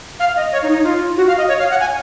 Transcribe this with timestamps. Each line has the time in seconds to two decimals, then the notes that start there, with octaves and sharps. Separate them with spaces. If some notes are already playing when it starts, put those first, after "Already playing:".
0.20 F5
0.36 D#5
0.52 C#5
0.63 D#4
0.73 D#4
0.84 F4
1.17 F#4
1.28 F5
1.38 D#5
1.48 C#5
1.59 F5
1.70 F#5
1.80 G#5